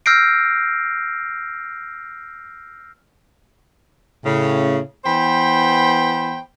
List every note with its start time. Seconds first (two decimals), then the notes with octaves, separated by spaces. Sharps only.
0.06 E6 F6 G6 A#6 C7 D7
4.25 A2 C#3
5.05 E3 B3 C5 G5 B5